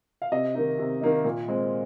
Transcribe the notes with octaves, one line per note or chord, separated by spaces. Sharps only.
F5
C3 D#5
D#3 A#3 D#4
C3
D#3 A#3 D#4
A#2
G#3 C4